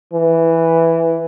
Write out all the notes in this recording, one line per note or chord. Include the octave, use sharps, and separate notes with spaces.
E3